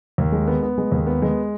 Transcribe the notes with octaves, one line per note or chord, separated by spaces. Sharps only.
D#2
G#3
B3
B3
G#3
D#2
B3
G#3